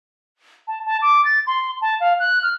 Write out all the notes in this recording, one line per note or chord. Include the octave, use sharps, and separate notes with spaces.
A5
A5
D6
A6
C6
A5
F5
F#6
F6